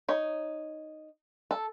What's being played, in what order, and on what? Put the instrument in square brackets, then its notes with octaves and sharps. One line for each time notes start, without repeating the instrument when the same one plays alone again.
[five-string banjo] D#4 C#5
A4